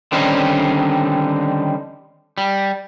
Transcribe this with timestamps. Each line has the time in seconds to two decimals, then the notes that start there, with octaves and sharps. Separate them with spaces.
0.12 D3 D#3 G3 C4 C#4 D#4
2.38 G3